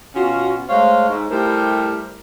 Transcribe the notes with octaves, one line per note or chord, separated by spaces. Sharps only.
B2 C#4 F4 F#4
G#3 A3 C5 C#5 F5
G#2 G#3
G3 A3 E4 G4 A#4 C5